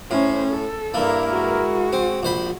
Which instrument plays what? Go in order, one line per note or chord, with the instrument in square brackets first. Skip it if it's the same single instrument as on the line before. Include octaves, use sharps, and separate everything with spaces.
[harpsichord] A2 [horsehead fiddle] C#4 C5
[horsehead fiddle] A4
[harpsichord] G2 A#3 [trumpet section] E4 A#4
[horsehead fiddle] G#3 F#4
[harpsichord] C4
A#1 C5 B5